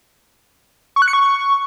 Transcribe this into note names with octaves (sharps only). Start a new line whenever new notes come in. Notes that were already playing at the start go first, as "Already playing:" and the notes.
C#6
F#6
C#7
C#6